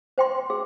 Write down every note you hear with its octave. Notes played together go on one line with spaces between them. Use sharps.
C5 G5 C6
G#4